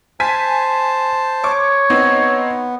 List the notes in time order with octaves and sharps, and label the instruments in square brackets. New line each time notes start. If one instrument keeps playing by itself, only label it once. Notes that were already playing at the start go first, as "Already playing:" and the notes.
[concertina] C5 A5 [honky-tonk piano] G#5 B6
[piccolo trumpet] C#5 [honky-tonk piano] C#6 D6
[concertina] B3 [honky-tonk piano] C4 D#4